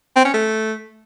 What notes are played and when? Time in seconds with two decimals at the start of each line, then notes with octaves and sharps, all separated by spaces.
0.16 C4
0.25 C#4
0.33 A3